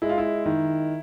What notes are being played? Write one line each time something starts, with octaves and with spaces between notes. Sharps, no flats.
G#3 E4
F4
E4
D#3